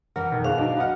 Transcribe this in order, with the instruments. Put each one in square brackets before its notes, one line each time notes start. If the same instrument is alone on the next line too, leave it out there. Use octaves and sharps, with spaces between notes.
[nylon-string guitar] F2 E3 F#5 [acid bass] A#4
[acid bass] B2 [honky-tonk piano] D#3
[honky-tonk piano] G1 G#4 F#6 [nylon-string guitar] C5 [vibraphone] F5
[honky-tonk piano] F#3 D4 D#4
[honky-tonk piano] F#3 D#5 F6 [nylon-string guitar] B4 F#5